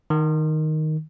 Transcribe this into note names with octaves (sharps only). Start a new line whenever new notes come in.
D#3